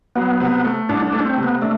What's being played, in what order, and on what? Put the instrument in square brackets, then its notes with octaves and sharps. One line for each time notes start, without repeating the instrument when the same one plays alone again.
[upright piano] F#3 [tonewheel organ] B3
[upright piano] C3
A3
[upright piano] C2 [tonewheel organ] D4
[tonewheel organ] D4
[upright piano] A3
[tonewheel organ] C4
[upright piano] C3
[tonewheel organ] B3
[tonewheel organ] A3 [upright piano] D4